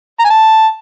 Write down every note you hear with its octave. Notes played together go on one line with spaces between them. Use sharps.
A#5
G#5
A5